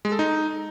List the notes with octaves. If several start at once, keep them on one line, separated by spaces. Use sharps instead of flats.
G#3
A4
D#4